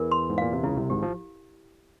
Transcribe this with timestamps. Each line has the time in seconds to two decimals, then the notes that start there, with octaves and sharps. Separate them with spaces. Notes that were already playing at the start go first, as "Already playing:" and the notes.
Already playing: E2 E3 A#4
0.11 C6
0.30 G#2
0.38 A#2 F5
0.53 C3
0.63 C#2 C#3 E4
0.77 C2 C3
0.89 G#1 G#2 G4
1.02 F3